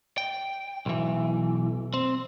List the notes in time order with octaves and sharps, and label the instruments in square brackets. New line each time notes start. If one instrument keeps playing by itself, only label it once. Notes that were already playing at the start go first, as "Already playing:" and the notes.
[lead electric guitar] G5
B1 E3
C4